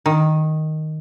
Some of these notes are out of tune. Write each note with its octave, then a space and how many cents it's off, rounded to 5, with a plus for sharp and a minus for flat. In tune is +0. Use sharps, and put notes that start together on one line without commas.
D#3 +0